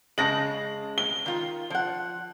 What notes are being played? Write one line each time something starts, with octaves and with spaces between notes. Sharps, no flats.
C#3 G#3 A5 A#6 F#7
G7
D#3 F4
F3 F#5